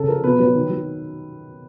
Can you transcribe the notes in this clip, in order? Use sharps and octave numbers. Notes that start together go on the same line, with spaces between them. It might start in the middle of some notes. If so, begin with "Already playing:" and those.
Already playing: C#3 A4
F3 A#4
B2 B4
F#3 B4
D#3
F#3